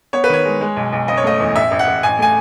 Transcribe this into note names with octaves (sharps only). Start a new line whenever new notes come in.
B3 C#5
B4
D#3 C#5
G#3
G#3
B1
B1
F#1 D#5
C#5
A3 D#5
E2
A1 E5
A1
F#5
A1
A1 G#5
A3 G#5